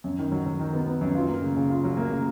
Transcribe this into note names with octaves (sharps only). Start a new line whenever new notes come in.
F#2
D#3
F#3
F#3
D#3
B3
B3
F#2
F4
A#3
C#3
C#3
F4
F#3
A#3
C#3